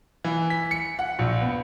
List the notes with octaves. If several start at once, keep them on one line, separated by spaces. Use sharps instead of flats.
E3
B6
C#7
F#5
A#1
B3